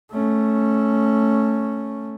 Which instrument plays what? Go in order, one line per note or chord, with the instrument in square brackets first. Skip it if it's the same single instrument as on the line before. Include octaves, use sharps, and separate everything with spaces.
[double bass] A3 C#4